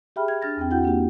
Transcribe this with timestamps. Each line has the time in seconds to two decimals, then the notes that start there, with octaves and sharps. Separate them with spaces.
0.16 G4 G#4 E5 G5 B5 F6
0.28 G#6
0.42 D4 F6 A6 A#6
0.57 E2 C4 G5
0.71 E4 F#4 F#5 G5 G6
0.83 A#3 D4 F4 G4